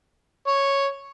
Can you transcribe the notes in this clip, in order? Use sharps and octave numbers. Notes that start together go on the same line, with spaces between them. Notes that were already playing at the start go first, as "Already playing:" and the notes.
C#5